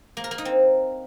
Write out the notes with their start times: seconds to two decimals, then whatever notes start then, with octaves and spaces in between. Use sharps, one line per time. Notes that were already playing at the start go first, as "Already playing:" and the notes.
0.17 A#3
0.24 A#4
0.31 A#3
0.38 D#4
0.45 C4